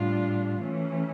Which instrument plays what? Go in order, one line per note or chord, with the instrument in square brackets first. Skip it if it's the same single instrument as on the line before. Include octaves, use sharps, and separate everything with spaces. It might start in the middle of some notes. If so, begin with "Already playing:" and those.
Already playing: [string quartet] A2 G3 D4 F4
E3 A3 C#4